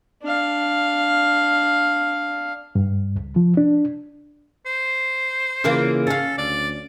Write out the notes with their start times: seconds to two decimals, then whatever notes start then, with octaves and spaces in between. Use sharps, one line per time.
0.23 D4 F5
2.75 G2
3.16 C#2
3.36 F3
3.57 D4
4.66 C5
5.64 C#3 E3 A#3 F4
6.07 C#4 A4 F5
6.38 D2 D5